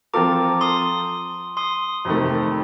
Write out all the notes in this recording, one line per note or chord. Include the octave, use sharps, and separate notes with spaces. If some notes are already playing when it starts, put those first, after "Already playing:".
F3 C4 F4 A4 A#5 D6
C6 D#6
C6 D#6
F2 C3 D#3 A3